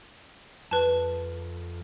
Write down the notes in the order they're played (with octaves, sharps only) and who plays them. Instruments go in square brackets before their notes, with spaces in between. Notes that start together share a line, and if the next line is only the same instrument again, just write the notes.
[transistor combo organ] F2 [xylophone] B4 A5